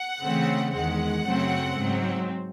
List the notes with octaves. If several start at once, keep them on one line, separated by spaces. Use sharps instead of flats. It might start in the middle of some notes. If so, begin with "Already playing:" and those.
Already playing: F#5
C#3 E3 A3 C4
E2 D#3 G#3 F#5
F#2 C#3 F#3 A3 C4
G#2 F#3 C4